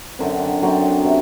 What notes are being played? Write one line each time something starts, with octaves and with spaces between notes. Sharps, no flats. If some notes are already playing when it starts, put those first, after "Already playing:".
F#2 D3 F#3 C4
F#2 D3 F#3 C4
C3